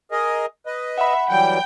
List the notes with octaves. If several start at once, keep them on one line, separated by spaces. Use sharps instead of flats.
G#4 A#4 D#5
B4 D#5
E5 F#5 B5
E3 F#3 G3 G5